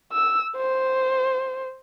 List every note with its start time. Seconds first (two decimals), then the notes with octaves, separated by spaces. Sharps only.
0.12 E6
0.57 C5